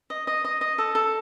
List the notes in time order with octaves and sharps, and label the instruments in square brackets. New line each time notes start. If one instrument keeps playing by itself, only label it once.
[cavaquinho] D#5
D#5
D#5
D#5
A4
A4